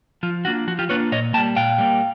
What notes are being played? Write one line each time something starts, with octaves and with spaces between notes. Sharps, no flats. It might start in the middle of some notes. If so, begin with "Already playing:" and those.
F3 F4
A#3 D4 F4 F#4
F3 F#4
F4 G4
A#3 D4 F4 B4 C#5
A#2 C#5 D#5
G3 A#3 G5 A5
A#2 F5 G5
G3 A#3